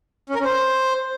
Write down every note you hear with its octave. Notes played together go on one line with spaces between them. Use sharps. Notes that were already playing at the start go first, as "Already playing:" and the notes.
C#4
A#4
C#4
C5